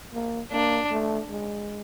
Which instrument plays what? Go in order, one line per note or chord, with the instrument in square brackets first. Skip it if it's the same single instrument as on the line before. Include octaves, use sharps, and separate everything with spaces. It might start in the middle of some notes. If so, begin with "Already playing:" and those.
[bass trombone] A#3
[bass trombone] A#3 [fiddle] D4
[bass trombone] A3
G#3